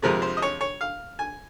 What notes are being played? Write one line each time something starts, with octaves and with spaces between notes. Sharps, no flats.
F2 C3 F3 G#3 A#4
C5
D#5
C#5
C#5
F5
G#5